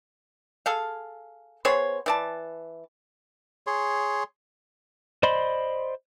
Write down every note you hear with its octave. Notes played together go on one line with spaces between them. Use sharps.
G#4 A4 F5
B3 G#4 C5 C#5
E3 D5 A5
G#4 C#5 C6
C5 D5 D#5 B5 C6